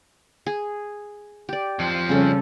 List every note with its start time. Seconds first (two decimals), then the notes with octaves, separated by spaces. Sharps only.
0.46 G#4
1.49 G4 D5
1.79 F2 F3
2.09 C#3 G3 C#4 A4